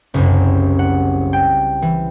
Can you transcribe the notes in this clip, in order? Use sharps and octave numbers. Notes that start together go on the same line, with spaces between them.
F#1 C2 F#2
F#5
G5
E3